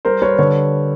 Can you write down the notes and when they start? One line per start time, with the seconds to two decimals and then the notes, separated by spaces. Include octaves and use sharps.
0.05 G3 A#4 C5
0.22 G3 B4 C#5
0.38 D3 B4 C#5